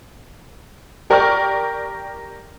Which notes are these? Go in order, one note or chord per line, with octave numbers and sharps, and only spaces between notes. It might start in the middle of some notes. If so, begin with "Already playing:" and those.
G4 A#4 D5 G5 C#6 F6